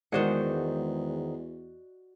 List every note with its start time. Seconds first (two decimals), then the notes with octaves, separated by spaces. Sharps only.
0.12 E2 D#3 G#3 F#4 C5 D5 D#5 F#5